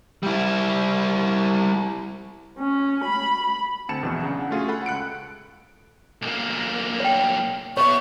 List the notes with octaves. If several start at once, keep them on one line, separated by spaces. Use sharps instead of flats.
G3 E4
C#4
B5
D2 C4 A5 C#7 E7
A#1 E2 B2 E3 F#3
C#3 D4 F#5
A3 C#4 F4 F#4 G#4 G#5
A4 F#5 B5
C#2 F#6 C#7 D7
B1 A#3
C#5 G5
B2 B3 C#5 E5 C#6